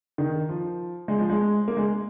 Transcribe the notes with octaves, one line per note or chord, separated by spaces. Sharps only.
D#3
F3
G#3
F3
G#3
A#3
G#3